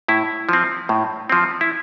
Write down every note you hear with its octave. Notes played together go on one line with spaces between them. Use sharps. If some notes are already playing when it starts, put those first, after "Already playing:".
A2 E4
F3 C4
A2
F3 C4
E4